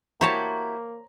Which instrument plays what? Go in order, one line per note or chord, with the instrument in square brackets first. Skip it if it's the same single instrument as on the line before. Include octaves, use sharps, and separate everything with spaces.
[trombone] A#3 [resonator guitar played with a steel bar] E4 F#4 G4 [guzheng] C5 C#5 A5 [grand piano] A#5